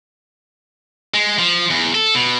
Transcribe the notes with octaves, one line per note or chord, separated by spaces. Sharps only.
G#3
F3
E2
A4
B2